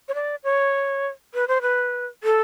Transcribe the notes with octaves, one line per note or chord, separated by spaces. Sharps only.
C#5
D5
C#5
B4
C5
B4
A4